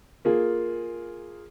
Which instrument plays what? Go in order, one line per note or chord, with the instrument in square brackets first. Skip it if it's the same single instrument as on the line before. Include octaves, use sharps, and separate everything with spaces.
[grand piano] A#3 F4 G#4